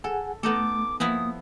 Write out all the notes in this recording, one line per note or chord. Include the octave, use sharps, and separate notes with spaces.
G#4 A4 F#5 G#5
A3 B3 D#4 A4 D6
F3 A#3 B3 E4 D#6